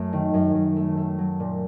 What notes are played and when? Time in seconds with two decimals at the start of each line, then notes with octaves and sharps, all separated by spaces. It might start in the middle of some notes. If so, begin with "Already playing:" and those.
Already playing: F#2 A3
0.13 D#3
0.34 F#2
0.55 F#2
0.77 A3
0.98 A3
1.19 F#3
1.40 A#2